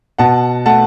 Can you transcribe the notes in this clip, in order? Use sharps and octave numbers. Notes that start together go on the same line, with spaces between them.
B2 F#5 A5
A3 F#5 A5